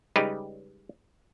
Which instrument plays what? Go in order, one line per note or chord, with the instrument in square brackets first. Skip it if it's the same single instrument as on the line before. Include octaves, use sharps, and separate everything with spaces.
[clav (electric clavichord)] C#3 G3 G#3 D#4 G4 B4